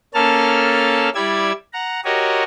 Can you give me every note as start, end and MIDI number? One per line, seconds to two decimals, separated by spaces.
0.14 1.09 58
0.14 1.09 61
0.14 1.09 69
0.14 1.09 81
0.14 1.09 89
1.15 1.52 55
1.15 1.52 64
1.15 1.52 74
1.15 1.52 88
1.15 1.52 92
1.73 2.01 78
1.73 2.01 82
2.05 2.43 66
2.05 2.43 67
2.05 2.43 70
2.05 2.43 73
2.05 2.43 75